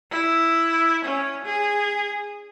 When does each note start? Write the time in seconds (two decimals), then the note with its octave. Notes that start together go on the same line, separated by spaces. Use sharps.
0.11 E4
1.05 C#4
1.45 G#4